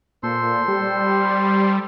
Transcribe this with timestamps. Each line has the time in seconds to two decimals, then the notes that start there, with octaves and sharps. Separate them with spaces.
0.23 A#2 A4 C5 C6
0.68 G3